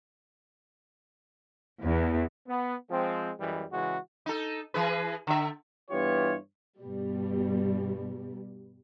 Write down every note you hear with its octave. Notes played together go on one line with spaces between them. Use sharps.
E2
B3
F3 G#3 C4
F#2 E3 G3 G#3
C#3 E3 G#3 F#4
D#4 A4
E3 G#4 B4
D3 E5
G2 E3 B3 F4 G4 C#5
G2 B2 G3